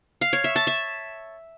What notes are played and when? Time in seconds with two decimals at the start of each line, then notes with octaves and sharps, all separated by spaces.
0.21 F5
0.33 C#5
0.44 E5
0.56 A5
0.67 E5